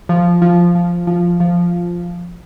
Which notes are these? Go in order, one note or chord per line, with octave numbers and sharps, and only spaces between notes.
F3
F3
F3
F3
F3